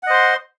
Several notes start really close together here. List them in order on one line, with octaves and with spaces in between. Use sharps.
F#5 D#5 C5 C6